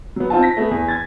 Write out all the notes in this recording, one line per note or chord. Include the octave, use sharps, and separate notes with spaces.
F#3 B3
C4 D#4 F4 A5
A#6 B6
A3 B3 G#4
E2
G#6 A6